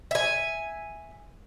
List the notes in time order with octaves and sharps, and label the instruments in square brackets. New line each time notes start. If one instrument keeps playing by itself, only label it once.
[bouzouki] E5 G#5